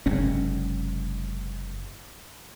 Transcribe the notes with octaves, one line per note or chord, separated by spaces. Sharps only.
F#1 G#2 C3 C#4